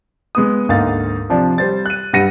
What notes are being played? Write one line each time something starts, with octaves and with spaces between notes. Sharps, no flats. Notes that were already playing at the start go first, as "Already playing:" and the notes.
G#3 B3 D#6
D2 G#2 A#3 D#4 F5 A6
C3 F3 D4
G3 C5 A6
F#6 D#7
G2 G3 F#5 A#6 C#7 D#7